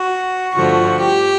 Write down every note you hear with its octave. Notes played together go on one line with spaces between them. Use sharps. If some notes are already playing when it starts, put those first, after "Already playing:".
Already playing: F#4
G2 D3 F3 A3 F#4
G4